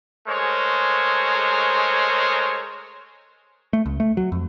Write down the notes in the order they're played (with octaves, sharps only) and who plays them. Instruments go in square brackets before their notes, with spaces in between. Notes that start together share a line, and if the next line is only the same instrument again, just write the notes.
[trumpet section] G#3 A3 G#4 A#4 C5 C#5
[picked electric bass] A3
C#2
A3
F#3
F2